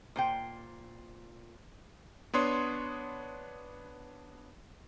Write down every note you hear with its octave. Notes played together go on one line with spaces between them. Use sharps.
A#2 C5 G5
B3 D4 C#5 C6 D#6